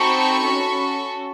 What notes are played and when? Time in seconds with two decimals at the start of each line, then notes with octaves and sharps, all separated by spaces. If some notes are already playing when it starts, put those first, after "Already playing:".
Already playing: C4 D#4 F#4 A4 B5 C#6
0.44 C#4 F#4 A4